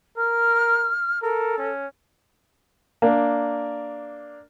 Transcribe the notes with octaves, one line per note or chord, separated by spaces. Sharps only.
A#4 F6
A4 A#4
C#4
A#3 D4